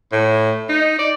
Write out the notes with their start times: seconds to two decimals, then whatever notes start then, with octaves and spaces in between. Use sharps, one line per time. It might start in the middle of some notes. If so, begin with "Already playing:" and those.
0.12 A2
0.69 D#4
0.99 D5